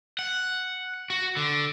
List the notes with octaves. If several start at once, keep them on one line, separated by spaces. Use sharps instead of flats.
F#5
F#4
D3